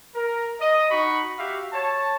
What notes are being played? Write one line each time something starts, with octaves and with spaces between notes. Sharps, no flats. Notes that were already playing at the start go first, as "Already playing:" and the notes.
A#4
D#5
D#4 F#4 B5 C#6
F#4 G4 E5 F5
C#5 A5